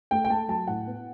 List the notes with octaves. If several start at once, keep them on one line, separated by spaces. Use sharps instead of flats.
A3 G5
G5
A3 A5
F#3 A5
A2 F#5
B3